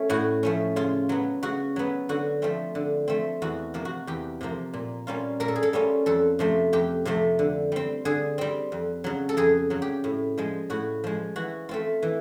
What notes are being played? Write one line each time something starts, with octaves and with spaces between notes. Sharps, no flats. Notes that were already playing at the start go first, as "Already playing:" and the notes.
Already playing: A3 C#4
A2 F#4
F3 A3 C#4
C#3 F4
F#3 B3
C#3 F#4
F#3 B3
D3 F#4
F3 A3 C4
D3
F3 A3 C4
E2 F#4
C3 F3 A#3
F#4
E2 G4
C3 F3 A#3
A#2
G3 A#3 C#4 F4
A#2 A#4
A4
G#4
A4
G3 A#3 C#4 F4
F2 A4
C3 F3 A3
F2 G4
C3 F3 A3
D3
G3 C4
D3 G#4
G3 C4
F2
C#3 F#3
A4
F2 G#4
C#3 F#3
G4
A2
F3 G#3
A2 F#4
F3 G#3
E3 F#4
A3 C4 F4
E3